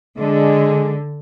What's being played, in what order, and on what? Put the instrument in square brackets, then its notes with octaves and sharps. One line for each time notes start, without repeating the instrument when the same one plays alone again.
[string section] D3 [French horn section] G#3